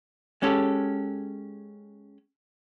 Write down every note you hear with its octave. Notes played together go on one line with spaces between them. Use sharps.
G#3 C#4 G4 A4